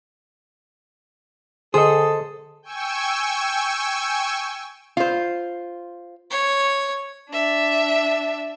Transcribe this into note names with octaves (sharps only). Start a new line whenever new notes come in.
D3 G#4 A4 C5 D#5 D#6
G5 G#5 C#6 E6
F4 C5
C#5
D4 E5